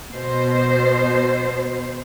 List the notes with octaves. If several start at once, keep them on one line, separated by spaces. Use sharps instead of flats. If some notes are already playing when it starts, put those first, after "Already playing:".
B2 C5